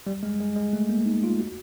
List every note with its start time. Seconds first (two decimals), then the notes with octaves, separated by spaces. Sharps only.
0.07 G3
0.23 G#3
0.40 G#3
0.56 G#3
0.73 A3
0.89 A#3
1.06 D#4
1.24 F4
1.40 F#4